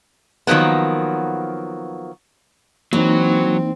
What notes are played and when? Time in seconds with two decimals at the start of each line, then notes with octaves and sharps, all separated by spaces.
0.47 D#3 F3 F#3 A#3 B3
2.93 E3 F#3 A#3 C4 D#4